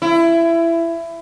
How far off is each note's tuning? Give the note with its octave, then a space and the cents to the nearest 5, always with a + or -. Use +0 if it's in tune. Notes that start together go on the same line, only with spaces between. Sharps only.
E4 +20